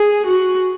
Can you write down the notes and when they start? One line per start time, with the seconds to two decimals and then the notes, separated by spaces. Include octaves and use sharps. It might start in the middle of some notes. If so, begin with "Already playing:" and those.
Already playing: G#4
0.26 F#4